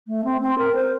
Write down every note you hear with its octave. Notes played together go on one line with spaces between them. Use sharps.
A3
C4
C4
A#4
C5